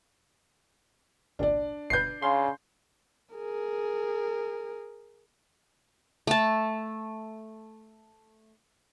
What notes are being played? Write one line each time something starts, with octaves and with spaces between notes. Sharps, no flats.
G#1 C#2 A#2 D4 D5
G1 B2 B4 G6 C7
C#3 F5 C6
G#4 A#4
A3 A5